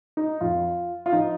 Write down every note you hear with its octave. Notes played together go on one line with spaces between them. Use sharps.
D#4
F2 F3 F4
F4
F3 D#4